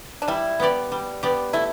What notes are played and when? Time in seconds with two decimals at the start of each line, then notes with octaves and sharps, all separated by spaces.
0.22 D4
0.28 G3 E4
0.60 B3 G4 D5
0.92 G3
1.23 B3 G4 D5
1.53 A3 E4